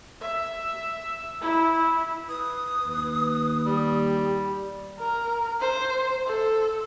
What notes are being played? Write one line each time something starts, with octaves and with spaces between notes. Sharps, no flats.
E5
E4
B4 D#6
D#2
G3 G4
A#4
C5
A4